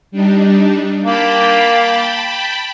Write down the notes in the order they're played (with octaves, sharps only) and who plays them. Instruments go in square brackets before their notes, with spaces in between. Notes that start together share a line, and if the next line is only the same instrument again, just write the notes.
[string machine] G3 D4 D#4
[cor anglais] A#3 [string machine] G5 A5 B5